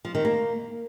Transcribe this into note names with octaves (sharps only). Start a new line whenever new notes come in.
F3
D#3
A#3